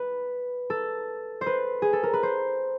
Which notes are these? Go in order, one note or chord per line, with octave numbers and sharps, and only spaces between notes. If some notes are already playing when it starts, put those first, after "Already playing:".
Already playing: B4
A4
C5
B4
G#4
A4
A#4
B4
C5